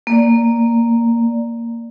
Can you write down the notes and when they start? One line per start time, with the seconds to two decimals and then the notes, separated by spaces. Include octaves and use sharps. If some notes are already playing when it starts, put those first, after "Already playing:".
0.07 A#3 D5